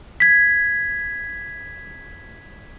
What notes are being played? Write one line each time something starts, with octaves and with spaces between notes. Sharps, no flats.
G#6 B6